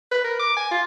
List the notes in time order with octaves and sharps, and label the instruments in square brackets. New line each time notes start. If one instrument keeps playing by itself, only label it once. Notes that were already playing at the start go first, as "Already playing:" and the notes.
[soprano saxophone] B4
A#4
D6
G#5
F4